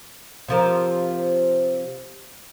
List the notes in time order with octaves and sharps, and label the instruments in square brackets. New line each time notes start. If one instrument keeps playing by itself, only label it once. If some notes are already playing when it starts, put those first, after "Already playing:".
[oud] C3 F3 A#4